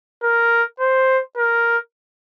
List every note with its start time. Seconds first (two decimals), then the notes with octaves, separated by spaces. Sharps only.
0.23 A#4
0.80 C5
1.38 A#4